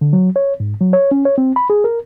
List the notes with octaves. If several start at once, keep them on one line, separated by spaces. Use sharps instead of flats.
D3
F#3
C#5
G#2
F#3
C#5
C#4
C#5
C4
B5
G#4
A#4